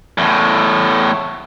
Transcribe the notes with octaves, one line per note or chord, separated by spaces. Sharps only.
E2 A2